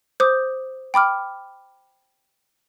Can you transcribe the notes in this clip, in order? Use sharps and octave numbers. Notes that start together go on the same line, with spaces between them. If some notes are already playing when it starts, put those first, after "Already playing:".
C5 D6 D#6 G6
G5 B5 D6 F6